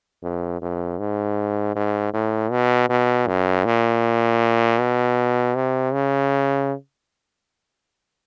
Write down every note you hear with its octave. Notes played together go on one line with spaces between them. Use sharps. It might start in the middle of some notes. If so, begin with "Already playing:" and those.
F2
F2
G#2
G#2
A2
B2
B2
F#2
A#2
B2
C3
C#3